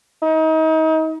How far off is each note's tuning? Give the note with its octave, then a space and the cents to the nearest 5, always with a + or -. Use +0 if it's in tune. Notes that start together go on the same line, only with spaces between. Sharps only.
D#4 +30